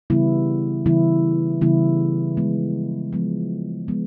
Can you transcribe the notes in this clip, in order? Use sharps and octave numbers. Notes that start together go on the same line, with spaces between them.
C#3 E3 G3 B3 E4
C#3 E3 G3 B3 E4
C#3 E3 G3 B3 E4
F3 G#3 B3
F3 G#3 B3
F3 G#3 B3